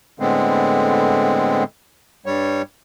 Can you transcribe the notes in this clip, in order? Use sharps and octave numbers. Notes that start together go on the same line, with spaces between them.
A2 D3 G#3 B3 C4
G2 G3 C#5